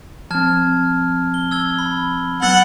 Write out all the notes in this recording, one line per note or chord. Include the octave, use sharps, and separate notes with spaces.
F3 C4 A5 F6 G#6
G7
E6 G#6 G7
B5
F#3 B3 F#5 B5 E6 A6 G7